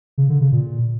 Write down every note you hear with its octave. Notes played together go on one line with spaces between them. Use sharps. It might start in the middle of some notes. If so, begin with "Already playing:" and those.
C#3
D3
C#3
A#2